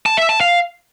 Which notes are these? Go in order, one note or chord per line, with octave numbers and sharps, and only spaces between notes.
A5
E5
A5
F5